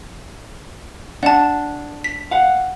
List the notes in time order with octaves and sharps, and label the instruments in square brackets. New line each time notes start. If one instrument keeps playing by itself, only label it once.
[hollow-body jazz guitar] D4 [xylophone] F#5 A5
[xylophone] B6
[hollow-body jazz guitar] F5 F#5